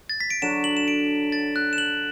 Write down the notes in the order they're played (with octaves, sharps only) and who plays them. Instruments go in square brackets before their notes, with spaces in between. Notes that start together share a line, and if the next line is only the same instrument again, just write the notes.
[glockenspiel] A6
B6
D7
[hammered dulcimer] D3 F#3 D4 [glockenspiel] E7
[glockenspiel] F#7
E7
D7
A6
F#6
E7
F#7